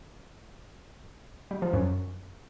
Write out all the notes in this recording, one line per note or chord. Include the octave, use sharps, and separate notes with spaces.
G3
F3
F#2